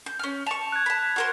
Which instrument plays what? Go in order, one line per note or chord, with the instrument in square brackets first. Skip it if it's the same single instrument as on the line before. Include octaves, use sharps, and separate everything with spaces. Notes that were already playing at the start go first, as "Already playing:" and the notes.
[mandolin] G6
C#4 F6
[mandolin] A5 C#6 [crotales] F7
[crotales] F#6 G#6
[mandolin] A5 B5
F#4 A#4 C5